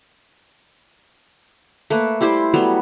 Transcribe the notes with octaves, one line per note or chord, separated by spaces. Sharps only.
A3 A#3 B4
G3 E4 G4 C5
F#3 G3 A3 B3